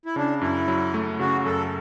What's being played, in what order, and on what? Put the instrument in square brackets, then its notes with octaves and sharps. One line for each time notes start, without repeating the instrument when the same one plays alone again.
[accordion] E4
[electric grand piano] C#3 [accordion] D4
[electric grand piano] F#2 [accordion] E4
[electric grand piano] F#3
A3
[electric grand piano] C#3 [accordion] F#4
[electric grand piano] F#2 [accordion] A4